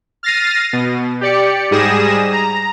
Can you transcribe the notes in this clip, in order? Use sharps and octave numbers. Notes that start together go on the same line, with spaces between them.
F6 A6 A#6 C7 D#7
B2
G4 D5 C#7
G#2 G3 G#4 D#6 A#6 E7
A#5